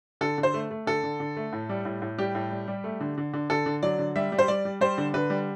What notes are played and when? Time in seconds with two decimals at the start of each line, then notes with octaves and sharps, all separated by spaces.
0.21 D3 A4
0.38 D3
0.43 C5
0.54 A3
0.71 A3
0.87 D3 A4
1.03 D3
1.20 D3
1.37 A3
1.53 A2
1.69 G3
1.85 A2
2.02 A2
2.18 G3 G4
2.35 A2
2.51 G3
2.68 G3
2.84 A3
3.00 D3
3.18 D3
3.34 D3
3.50 D3 A4
3.66 D3
3.83 F#3 D5
3.99 D3
4.16 G3 E5
4.32 G3
4.39 C5
4.48 G3 D5
4.65 G3
4.81 G3 C5
4.98 D3
5.14 D3 B4
5.30 G3